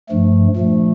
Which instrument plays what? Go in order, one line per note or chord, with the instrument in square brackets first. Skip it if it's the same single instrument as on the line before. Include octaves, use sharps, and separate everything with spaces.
[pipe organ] G2 F3 A3
A#2 F3 A3